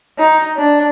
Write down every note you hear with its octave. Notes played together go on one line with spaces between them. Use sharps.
D#4
D4